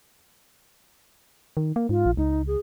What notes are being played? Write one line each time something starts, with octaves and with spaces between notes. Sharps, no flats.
D#3
A#3
G#2 F4
A#1
C#2 D#4
G#4